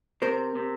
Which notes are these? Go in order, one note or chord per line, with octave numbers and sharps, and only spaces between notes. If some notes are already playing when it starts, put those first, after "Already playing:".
C3 A#4 C5
C3